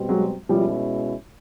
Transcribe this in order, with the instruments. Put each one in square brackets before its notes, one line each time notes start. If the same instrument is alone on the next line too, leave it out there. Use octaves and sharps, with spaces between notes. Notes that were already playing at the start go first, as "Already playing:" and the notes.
Already playing: [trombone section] B2 G3 C4
[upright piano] F#3 G#3
[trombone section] B2 G#3 C#4 E4 [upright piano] F3 G3